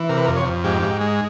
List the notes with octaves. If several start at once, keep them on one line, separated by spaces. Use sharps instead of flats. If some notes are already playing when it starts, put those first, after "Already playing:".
Already playing: E3
C3 A#4
B4
F2 A#4
C#5
F2
G#2 G4
G#2
G#3